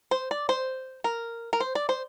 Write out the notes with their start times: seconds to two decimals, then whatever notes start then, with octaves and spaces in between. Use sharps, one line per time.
0.11 C5
0.31 D5
0.49 C5
1.04 A#4
1.53 A#4
1.60 C5
1.75 D5
1.89 C5